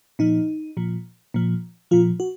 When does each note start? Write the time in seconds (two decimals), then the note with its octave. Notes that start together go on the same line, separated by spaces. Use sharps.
0.19 A#2 F3 D#4
0.77 A#2 F3
1.34 A#2 F3
1.91 A#2 F3 F4
2.20 F#4